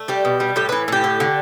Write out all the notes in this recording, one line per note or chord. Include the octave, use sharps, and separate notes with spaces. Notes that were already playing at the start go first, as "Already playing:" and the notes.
Already playing: A3
G3 G4
B2
G3
A2 G4
E3 B4
A2 G4
D3
D3